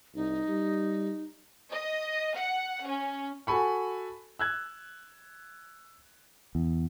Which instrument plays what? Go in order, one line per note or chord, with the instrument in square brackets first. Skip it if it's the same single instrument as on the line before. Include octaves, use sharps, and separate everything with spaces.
[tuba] C2 [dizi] D#4
[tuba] G3
[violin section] D#5
F#5
C#4
[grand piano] F#4 A4 G#5 B5 C#6
E6 F#6 G#6
[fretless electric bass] E2